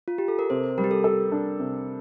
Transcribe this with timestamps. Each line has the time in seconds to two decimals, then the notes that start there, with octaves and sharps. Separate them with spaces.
0.08 F4
0.18 G4
0.28 A4
0.39 A#4
0.50 C3 C5
0.78 G3 A#4
0.84 G4
0.91 A4
1.04 A4 A#4
1.32 D4
1.60 C3